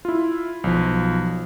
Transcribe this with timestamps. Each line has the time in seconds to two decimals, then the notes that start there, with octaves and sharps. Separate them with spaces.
0.05 E4 F4
0.64 B1 F3